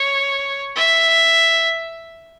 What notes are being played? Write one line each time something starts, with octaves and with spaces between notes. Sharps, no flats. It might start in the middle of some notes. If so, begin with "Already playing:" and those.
Already playing: C#5
E5